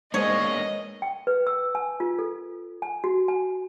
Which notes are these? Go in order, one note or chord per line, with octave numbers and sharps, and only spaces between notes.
G#3 A#3 B3 D4 C#5 D#5
G5
B4
E6
G#5
F4
A4
G#5
F#4
G#5